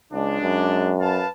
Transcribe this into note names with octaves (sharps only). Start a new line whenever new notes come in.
C#2 G#3 D4
F#2
B4 F5 A5